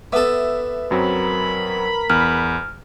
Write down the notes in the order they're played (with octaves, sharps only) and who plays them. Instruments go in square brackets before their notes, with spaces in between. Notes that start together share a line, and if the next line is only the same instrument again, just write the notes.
[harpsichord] B3 A4 [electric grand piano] E5 D6
[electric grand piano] F#2 F#3 C4 [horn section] A#4 B5
[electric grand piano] E2 [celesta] F6